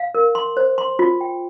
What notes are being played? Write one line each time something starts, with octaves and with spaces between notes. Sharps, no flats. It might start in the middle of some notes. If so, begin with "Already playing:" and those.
Already playing: F5
A#4
C6
C5
C6
F4
G5